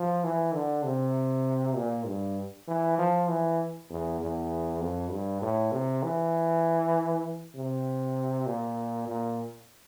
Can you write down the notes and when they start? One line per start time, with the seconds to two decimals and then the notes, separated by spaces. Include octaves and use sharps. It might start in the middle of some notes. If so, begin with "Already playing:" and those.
Already playing: F3
0.24 E3
0.54 D3
0.85 C3
1.76 A#2
2.06 G2
2.68 E3
2.98 F3
3.28 E3
3.90 E2
4.20 E2
4.81 F2
5.11 G2
5.42 A2
5.72 C3
6.03 E3
7.55 C3
8.46 A#2
9.08 A#2